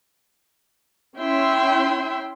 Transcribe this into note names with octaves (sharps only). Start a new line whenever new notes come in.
C#4 E4 E5 G5 C6